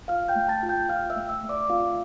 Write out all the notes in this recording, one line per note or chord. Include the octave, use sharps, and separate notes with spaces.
F4 F5 F6
G5 G6
A3
A5 A6
F4
G5 G6
F4 F5 F6
E5 E6
A3
E5 E6
A3
D5 D6
C4 F4 F5